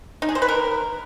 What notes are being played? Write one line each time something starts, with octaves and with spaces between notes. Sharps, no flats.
D#4
G#4
C5
B4
A#4